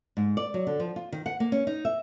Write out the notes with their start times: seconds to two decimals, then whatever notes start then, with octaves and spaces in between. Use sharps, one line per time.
0.17 G#2
0.37 D5
0.54 F#3
0.67 D3
0.80 F3
0.96 F4
1.12 D#3
1.26 F#5
1.40 A#3
1.52 C#4
1.67 D#4
1.85 E5